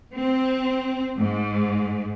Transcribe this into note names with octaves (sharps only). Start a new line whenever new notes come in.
C4
G#2